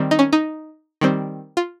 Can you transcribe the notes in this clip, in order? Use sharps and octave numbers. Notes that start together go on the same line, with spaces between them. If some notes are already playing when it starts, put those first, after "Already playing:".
Already playing: D#3 G3 C4
D#4
C#4
D#4
D#3 G3 C4
F4